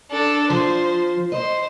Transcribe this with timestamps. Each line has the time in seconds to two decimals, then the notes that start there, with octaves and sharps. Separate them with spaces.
0.11 D4 A4
0.50 F3 C5
1.32 C5 D#5